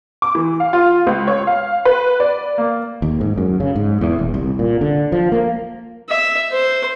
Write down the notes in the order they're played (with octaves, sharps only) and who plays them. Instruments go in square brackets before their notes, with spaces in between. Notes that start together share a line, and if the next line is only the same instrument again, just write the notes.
[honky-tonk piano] D6
E3
F5
F4
C#2
C#5
F5
B4
D5
A#3
[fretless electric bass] D#2
G#2
F#2
C#3
G#2
E2
D#1
C2
A#2
D3
F3
A#3
[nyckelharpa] E5
C5